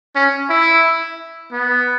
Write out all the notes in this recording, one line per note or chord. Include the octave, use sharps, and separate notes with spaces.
C#4
E4
B3